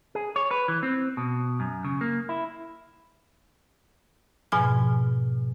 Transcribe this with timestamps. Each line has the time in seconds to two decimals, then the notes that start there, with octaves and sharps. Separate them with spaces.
0.15 G#4
0.36 C#5
0.51 B4
0.68 E3
0.83 C4
1.17 B2
1.60 F#2
1.85 C#3
2.01 A#3
2.29 E4
4.52 G#2 B2 F3 G#5 F6